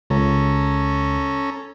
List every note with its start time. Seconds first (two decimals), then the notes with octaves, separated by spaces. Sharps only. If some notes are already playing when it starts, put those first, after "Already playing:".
0.10 C#2 C#4 A4 A#5